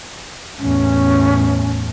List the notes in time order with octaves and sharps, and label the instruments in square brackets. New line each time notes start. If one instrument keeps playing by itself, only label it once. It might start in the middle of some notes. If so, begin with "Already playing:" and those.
[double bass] E2 A2 [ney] C#4